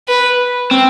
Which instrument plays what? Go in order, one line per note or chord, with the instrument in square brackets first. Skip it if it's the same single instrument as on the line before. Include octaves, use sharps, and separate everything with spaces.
[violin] B4
[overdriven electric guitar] C4